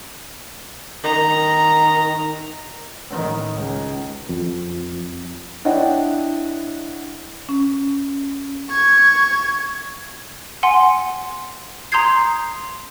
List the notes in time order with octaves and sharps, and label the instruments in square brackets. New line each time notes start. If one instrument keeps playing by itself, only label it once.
[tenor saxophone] D#3 [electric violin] A#5
[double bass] A2 D#3
C#2
[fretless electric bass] F2
[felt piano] D4 E4 C#5 D#5 F#5 G5
[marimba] C#4
[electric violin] C#6 G#6
[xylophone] F#5 G#5 C6
A#5 C6 D#6 G6 G#6 C7